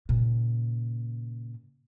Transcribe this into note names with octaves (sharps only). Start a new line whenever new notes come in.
A#2 C#3